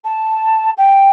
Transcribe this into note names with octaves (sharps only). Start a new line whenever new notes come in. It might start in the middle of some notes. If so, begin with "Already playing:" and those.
A5
G5